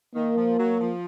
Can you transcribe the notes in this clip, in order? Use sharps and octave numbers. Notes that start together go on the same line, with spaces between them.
D#3 A#3
F3
F#3
F3